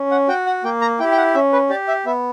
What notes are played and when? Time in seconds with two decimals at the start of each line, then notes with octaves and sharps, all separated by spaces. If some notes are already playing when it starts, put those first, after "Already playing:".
Already playing: C#4
0.11 F#5
0.28 F#4 G5
0.47 F#5
0.64 A#3 G5
0.81 A#5
0.99 E4 G4 G5
1.12 G5
1.18 F#5
1.34 C#4 E5
1.53 B4
1.70 G4 D5
1.88 E5
2.06 B3 E5